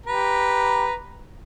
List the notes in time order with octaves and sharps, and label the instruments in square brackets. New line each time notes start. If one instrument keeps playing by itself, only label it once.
[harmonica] G4 B4 A#5